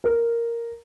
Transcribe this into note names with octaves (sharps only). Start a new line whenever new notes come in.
A#4